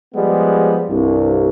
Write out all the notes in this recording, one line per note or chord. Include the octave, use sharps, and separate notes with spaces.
F3 G3 G#3 B3
C2 G2